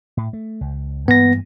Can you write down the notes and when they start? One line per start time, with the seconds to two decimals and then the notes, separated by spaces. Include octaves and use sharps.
0.17 A2
0.33 A3
0.61 C#2
1.08 G2 E3 A#3 B3 A#6